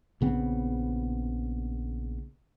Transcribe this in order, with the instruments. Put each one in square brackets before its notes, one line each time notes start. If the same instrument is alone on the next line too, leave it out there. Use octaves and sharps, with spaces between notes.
[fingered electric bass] A#1 C#3 B3 C4